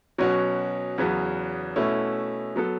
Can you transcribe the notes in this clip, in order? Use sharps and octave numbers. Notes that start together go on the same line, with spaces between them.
B2 F#3 C#4 F#4
E2 C#3 F#3 B3
B2 A3 C#4 E4
F#3 B3 A4